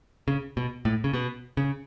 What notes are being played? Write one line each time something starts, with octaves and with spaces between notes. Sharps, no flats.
C#3
B2
A2
C#3
B2
C#3